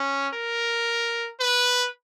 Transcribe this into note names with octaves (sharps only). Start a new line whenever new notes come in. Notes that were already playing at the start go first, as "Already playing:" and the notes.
Already playing: C#4
A#4
B4